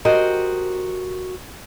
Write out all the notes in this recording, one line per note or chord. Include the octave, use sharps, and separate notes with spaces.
F#4 G4 A#4 C5 D#5